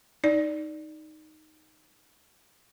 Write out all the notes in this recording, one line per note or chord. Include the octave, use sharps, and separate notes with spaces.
D#4 D5